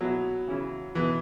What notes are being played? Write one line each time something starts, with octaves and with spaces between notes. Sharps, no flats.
B2 F#3 B3 E4
C#3 E3 C#4 E4
B2 E3 B3 E4